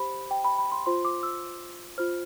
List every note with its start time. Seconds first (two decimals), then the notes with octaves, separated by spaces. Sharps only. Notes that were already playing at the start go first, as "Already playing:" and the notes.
Already playing: G4 C5 B5
0.31 G5
0.44 B5
0.58 B5
0.72 C6
0.86 F4 C5 C6
1.05 D6
1.23 E6
1.98 F4 C5 F6